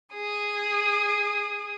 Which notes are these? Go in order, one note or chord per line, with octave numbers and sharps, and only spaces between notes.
G#4 D#6